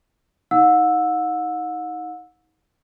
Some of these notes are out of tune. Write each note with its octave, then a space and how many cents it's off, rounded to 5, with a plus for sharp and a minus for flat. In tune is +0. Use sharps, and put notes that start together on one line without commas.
D#4 +30 F#5 -40 E6 +0